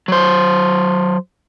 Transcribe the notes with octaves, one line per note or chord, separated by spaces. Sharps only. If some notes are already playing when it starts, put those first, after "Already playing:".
F#3 C5